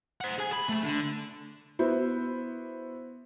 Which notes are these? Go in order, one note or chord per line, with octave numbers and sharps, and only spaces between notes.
C5 F#5
G#4 G#5
B5
A3
D3
B3 E4 F#4 C5